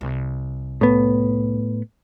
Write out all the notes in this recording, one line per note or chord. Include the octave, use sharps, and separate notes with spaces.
C2
A2 B3